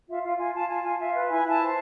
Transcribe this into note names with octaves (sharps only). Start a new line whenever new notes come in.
F4 E5
F4 F5
F4 G#5
F4 A5
F4 G#5
F4 G#5
F4 E5
B4
E4 G#5
E4
A5
C5